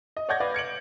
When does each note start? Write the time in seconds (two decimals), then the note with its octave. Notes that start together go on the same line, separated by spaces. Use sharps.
0.17 D#5
0.29 C#5 D5 F#5 G6 G#6 A#6
0.40 B4 D5 F5
0.54 G#6 C#7 D7 F#7